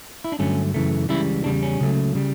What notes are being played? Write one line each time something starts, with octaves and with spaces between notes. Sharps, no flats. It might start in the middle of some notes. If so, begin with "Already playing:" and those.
E4
D4
G2 D3 F#3 A3 C#4
F#2 C#3 E3 A3
C#2 C#3 E3 G3 E4
E2 C#3 G3 D4
C#4
C#2 C#3 F#3 A3
C#3 G3